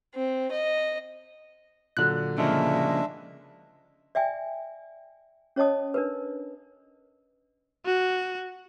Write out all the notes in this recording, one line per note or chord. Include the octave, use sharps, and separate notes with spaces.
C4
D#5
A#2 D3 F#3 F#6
C#3 F3 G#3 A#3 D4 E5
D5 E5 G5 G#5
C#4 C#5 D#5 A5 D#6
D4 A#4 B4
F#4